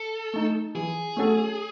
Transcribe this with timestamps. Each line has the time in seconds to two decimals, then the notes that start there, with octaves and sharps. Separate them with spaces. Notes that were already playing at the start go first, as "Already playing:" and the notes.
Already playing: A4
0.33 A3 D#4
0.75 E3 G#4
1.17 A3 C#4 F#4 A4